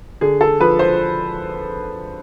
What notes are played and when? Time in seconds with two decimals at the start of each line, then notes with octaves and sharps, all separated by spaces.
0.21 D3 G#4
0.41 A4
0.60 F3 B4
0.79 C5